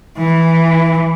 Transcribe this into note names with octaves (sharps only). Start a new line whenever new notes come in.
E3